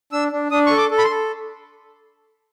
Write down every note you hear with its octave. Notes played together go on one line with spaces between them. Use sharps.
D4 E6
D4
D4 D#6
A4 C#6
D6
A4
B5
C6
A4